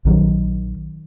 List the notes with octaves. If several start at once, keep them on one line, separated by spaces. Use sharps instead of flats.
A#1 D#3 F#3